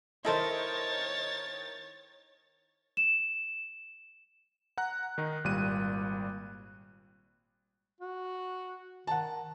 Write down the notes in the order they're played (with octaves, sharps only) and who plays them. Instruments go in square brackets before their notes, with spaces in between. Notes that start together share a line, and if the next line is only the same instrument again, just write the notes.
[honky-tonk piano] D#3 A#4 D#5 [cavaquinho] E4 A4 C5 [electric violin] C#5 A6
[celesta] E7
[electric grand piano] F#5 A#5 F#6
D#3 D#4
G#1 A#2 G3 F#6 D#7
[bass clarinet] F#4
[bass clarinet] D#3 [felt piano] F#5 A5